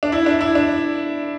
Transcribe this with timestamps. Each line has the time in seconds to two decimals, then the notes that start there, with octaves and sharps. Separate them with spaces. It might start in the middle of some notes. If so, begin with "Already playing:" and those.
0.03 D4
0.12 E4
0.26 D4
0.41 E4
0.55 D4